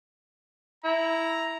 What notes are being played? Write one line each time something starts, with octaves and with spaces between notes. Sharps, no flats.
E4 A#5